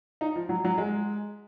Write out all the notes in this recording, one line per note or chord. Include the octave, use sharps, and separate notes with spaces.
D#4
F3
F#3
F#3
G#3